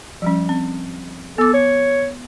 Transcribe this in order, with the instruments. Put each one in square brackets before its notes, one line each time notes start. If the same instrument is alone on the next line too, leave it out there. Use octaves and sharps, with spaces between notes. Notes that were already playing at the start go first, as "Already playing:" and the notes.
[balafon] F3 G3 C#4
C4
[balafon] B3 D6 [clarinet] A4
[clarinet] C#5